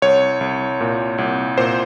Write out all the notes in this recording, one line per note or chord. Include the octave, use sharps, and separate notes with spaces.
C2 C#5
C2
A#2
C2
A#2 C5